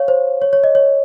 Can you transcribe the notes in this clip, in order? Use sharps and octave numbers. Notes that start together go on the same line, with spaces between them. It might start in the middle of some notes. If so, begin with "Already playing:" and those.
Already playing: C#5 F5
C5
C#5
C#5
D#5
C#5